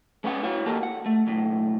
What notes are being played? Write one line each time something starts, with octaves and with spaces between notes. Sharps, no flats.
G#3 B3 C#4 C5 F#5
E4 F#4 C#5 F#5
A#3 G4 A4 A#4
F#5
A3
B1 A2